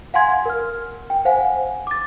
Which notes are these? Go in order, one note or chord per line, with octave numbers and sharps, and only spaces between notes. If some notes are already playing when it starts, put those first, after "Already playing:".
F5 F#5 G#5 C6 G#6
A#4 F6
G5
C5 F5 F#5 G#5
D6 A6